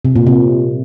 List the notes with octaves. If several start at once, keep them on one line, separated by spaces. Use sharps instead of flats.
C3
A#2
C3